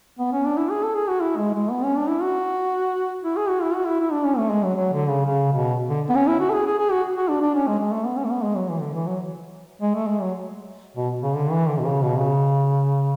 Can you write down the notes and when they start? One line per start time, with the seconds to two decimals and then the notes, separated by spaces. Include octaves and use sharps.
0.19 B3
0.33 C#4
0.45 D4
0.57 E4
0.71 G#4
0.83 A4
0.95 G#4
1.08 F#4
1.21 E4
1.37 G#3
1.54 G#3
1.71 B3
1.83 C#4
1.97 D4
2.09 E4
2.22 F#4
3.23 E4
3.36 G#4
3.49 F#4
3.62 E4
3.75 F#4
3.86 E4
4.00 E4
4.12 D4
4.24 C#4
4.38 A3
4.50 G#3
4.64 F#3
4.75 F#3
4.93 D3
5.09 C#3
5.26 C#3
5.52 B2
5.89 D3
6.09 B3
6.15 C#4
6.27 E4
6.40 F#4
6.50 A4
6.54 G#4
6.66 G#4
6.78 G#4
6.91 F#4
7.17 F#4
7.29 D4
7.41 D4
7.54 C#4
7.68 G#3
7.79 G#3
7.92 A3
8.06 B3
8.17 C#4
8.25 A3
8.31 B3
8.44 G#3
8.56 F#3
8.70 E3
8.81 D3
8.94 E3
9.07 F#3
9.82 G#3
9.95 A3
10.07 G#3
10.21 F#3
10.97 B2
11.22 C#3
11.35 D3
11.52 E3
11.69 D3
11.78 B2
11.85 C#3
12.03 B2
12.20 C#3